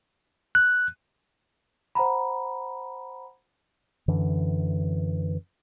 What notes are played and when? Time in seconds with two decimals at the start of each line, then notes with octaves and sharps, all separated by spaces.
0.55 F#6
1.95 C5 F#5 A#5 B5
4.08 F#2 D3 E3